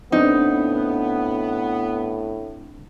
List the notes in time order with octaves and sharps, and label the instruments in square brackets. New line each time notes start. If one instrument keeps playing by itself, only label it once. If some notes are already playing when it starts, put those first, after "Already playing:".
[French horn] A2 [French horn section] B3 [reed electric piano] C4 D4 [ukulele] D#4